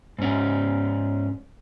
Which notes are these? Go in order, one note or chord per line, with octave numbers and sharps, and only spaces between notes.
G#2 C#4